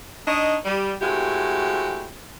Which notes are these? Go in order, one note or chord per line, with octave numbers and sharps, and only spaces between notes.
D4 D#4 C#5 D#5
G3
G#3 A3 C4 E4 F#4 G4